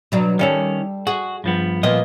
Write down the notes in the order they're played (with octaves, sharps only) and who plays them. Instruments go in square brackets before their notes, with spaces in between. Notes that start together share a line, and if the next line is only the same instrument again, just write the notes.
[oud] B2 F#3 D4
[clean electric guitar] D#3 C#4 [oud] G3 F4 A4
[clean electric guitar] F#4 [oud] G#4
[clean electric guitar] G2 F3 B3
[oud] A#2 F3 B3 [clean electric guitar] A#3 D#5